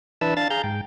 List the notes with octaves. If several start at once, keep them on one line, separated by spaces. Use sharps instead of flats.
E3 D4 B4 E5 A5 E6
D4 F5 A5 A6
G#4 F5 A#5 G6
G#2 G5